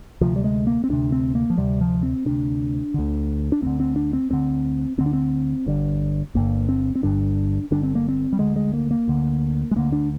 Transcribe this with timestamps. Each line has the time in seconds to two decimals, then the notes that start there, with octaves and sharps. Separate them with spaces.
0.21 D2 C3 F3
0.36 G3
0.44 G#3
0.67 A#3
0.84 C4
0.90 D2 C3 D4
1.12 C4
1.35 A#3
1.50 F3
1.58 D2 C3 G3
1.81 F3
2.03 C4
2.26 D2 C3 D4
2.94 D2 D3
3.52 D4
3.62 D2 D3 C4
3.80 C4
3.96 D4
4.13 C4
4.30 D2 D3 C4
4.98 D2 D3 C4
5.06 D4
5.13 C4
5.66 G1 G2 D3
6.35 G1 G2 D3 A#3
6.69 C4
6.95 C4
7.03 G1 G2 D3 D4
7.71 G1 G2 D3 D4
7.83 C4
7.95 A#3
8.09 C4
8.33 G3
8.39 D2 D3 G#3
8.56 G#3
8.73 A#3
8.91 A#3
9.08 D2 D3
9.71 G#3
9.76 D2 D3 A#3
9.92 D4